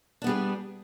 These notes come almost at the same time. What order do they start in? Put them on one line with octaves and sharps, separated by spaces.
D4 B3 G3 G#4